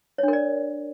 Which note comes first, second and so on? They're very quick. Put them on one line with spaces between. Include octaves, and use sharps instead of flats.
C#5 D4 A#4 D5